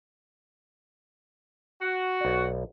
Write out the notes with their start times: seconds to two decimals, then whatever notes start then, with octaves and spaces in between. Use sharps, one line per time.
1.81 F#4
2.21 B1 D5